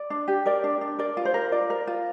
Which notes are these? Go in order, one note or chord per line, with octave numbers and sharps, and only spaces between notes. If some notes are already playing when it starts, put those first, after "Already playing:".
Already playing: D5
D4
G4
A#4 D5
D4
D4
A#4 D5
F4
C5
A#4
F4 D5
A#4
F4